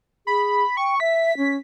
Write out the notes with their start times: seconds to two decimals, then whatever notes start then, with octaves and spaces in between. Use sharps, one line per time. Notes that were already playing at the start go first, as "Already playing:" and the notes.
0.27 G#4 B5
0.77 G5 C#6
1.00 E5 B6
1.38 C#4